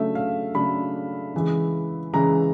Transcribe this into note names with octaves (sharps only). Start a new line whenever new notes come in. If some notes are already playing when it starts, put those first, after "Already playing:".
Already playing: C#3 F#3 A3 D4 E5
F5
C#3 F#3 A3 D4 B5
C#3 E3 G#3
C#3 E3 G#3 A#5